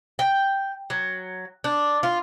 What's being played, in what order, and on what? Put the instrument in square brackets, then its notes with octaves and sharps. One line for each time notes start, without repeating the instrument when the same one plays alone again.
[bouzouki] G5
F#3
D4
F4